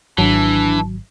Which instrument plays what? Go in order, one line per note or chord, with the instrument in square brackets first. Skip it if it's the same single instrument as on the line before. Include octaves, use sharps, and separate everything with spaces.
[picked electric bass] G#1 [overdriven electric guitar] E3 [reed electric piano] F#3 [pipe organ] D4